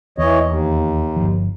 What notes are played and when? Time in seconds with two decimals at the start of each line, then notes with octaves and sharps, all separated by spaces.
0.18 E2 E3 C#5 D#5
0.44 D#2
1.16 G1 F3